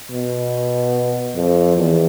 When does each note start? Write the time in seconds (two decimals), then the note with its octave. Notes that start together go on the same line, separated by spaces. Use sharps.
0.11 B2
1.35 F2
1.77 E2